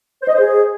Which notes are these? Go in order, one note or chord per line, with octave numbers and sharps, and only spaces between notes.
C5
D#5
C5
G#4